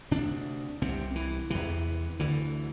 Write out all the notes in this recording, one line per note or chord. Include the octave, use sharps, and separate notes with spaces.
D2 C3 D4
C2 C3 C4
E3
E2 C3 E3
D2 D3 E3